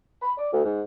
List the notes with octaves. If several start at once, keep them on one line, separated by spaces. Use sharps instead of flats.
B5
D5
D2
G#2